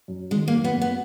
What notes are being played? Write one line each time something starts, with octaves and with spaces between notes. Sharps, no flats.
F#2
D#3 G#3
A#3
F#2
B3
F#2
B3